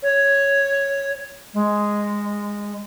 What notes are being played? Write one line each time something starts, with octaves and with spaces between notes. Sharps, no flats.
C#5
G#3